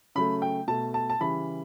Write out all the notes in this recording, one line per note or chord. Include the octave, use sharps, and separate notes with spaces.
C#3 F#3 A3 B5
G5
B2 A3 A5
A5
A5
C#3 E3 G3 B5